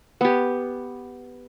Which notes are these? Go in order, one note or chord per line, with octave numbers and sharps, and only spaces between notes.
B3 G4